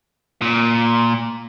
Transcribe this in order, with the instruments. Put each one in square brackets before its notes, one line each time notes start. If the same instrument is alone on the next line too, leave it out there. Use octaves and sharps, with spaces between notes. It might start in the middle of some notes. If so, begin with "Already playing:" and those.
[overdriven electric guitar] A#2